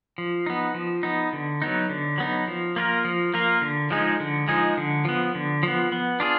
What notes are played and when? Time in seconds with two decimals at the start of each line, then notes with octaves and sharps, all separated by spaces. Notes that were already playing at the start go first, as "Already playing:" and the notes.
0.18 F3
0.46 B3 D#4
0.74 F3
1.03 B3 D#4
1.33 D3
1.62 F#3 B3 D#4
1.90 D3
2.18 F#3 B3 D#4
2.48 F3
2.76 A#3 F4 A#4
3.05 F3
3.34 A#3 F4 A#4
3.61 D3
3.90 F3 G#3 D#4 G#4
4.20 D3
4.48 F3 G#3 D#4 G#4
4.77 D3
5.05 F3 B3
5.35 D3
5.63 F3 B3
5.92 B3
6.20 D4 F4 G#4